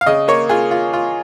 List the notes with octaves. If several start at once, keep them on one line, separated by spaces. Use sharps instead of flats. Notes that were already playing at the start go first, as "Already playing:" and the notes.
F5
C#3 D#5
A#3 C#5
F4 G#4
F4
F4